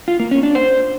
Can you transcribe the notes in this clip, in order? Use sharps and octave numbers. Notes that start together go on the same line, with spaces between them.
F4
A#3
C#4
D4
C5